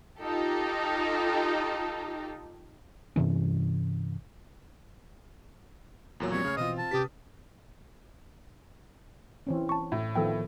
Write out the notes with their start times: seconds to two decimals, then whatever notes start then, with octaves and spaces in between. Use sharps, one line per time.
0.19 D#4 F4 G4 A4
3.16 G2 C3 E3 C#4
6.20 E2 A#2 F#3
6.32 F3 G3 C4 C#5
6.45 C#3 A3 F6
6.57 B2 E3 C4 F4 D#5
6.78 A5
6.91 C3 C#4 G4 B4 D#6 B6
9.47 E3 C4 C#4
9.69 A5 C#6
9.92 A2
10.15 D#3 F3 B3 A4 G5